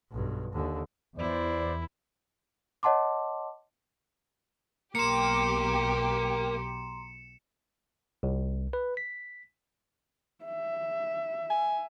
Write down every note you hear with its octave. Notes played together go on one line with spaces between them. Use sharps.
B1 G2
D#2 D3
E2 E4 C5 D5
C#5 D#5 F#5 A5 C6 D6
B1 A#3 G4 A#5 C6 C#7 E7
C2
B4
B6
E5
G#5